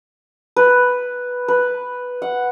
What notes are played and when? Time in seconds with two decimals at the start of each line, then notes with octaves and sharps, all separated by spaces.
0.56 B4
1.48 B4
2.22 F#5